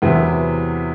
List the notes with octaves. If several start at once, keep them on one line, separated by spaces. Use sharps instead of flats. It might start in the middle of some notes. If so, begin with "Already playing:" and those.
E2 C3 F#3 B3 E4